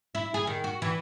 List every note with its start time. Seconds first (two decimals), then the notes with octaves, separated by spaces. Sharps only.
0.15 E4
0.34 G#4
0.47 D#3
0.64 F#4
0.82 E3